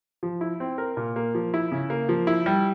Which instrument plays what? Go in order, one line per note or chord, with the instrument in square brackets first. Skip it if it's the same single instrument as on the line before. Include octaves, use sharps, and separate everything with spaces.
[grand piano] F3
E4
C4
A#4
A#2
A#3
F3
E4
C#3
A#3
F3
E4
G3